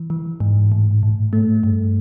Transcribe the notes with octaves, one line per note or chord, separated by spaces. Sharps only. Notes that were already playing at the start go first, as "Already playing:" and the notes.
Already playing: E3
E3
G#2
A2
A2
A3
G2